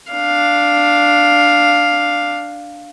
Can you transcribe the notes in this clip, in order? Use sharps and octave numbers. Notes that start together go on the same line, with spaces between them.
D4 F5